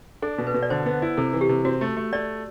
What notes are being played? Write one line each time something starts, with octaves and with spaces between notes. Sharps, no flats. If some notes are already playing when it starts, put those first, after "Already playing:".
D4 A4
B2
B4
B2
D5
D3 C5
B3
E4
C3 A4
E3
G4
C3
C4 F#4
A3
A3
A3 D5